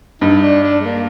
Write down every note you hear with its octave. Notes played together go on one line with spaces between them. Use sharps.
G2 D#4
D4
D4
G#3
A#3